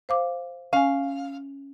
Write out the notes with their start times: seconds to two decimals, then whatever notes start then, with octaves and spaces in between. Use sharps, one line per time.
0.09 C5 F5 D6
0.73 C#4 F5 G#5